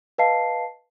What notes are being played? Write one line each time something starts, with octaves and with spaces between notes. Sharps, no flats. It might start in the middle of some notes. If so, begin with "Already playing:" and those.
B4 D#5 F5 A5 C7